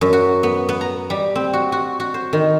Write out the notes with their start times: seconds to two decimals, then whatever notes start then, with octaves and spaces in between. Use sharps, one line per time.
0.01 F#2
0.13 F#4
0.43 B3
0.69 B3
0.81 A#5
1.10 G3
1.35 C4
1.53 F#4
1.72 F#4
2.00 F#4
2.14 C5
2.33 D#3